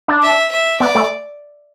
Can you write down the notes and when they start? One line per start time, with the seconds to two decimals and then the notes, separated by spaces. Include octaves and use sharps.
0.08 D4
0.22 E5
0.51 E5
0.80 B3 D5
0.95 A3